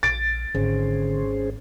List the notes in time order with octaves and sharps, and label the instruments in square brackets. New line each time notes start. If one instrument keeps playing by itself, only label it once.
[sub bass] A#1 [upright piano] A6 D7
[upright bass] G#1 [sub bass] D3 [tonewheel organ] C#4 G#4 C5